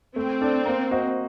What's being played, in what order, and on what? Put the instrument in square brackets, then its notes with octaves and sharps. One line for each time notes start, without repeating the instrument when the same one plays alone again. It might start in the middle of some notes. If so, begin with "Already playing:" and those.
[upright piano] A3 [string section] C4
[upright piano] D4 A4 D5
A#3
F#4 C5 D#5